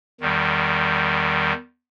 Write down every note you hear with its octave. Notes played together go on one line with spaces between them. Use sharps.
E2 D#3 G3